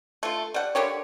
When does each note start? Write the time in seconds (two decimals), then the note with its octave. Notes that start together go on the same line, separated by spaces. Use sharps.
0.23 A3 F4
0.54 G3 F#5
0.75 D3 A#3 G4 C#5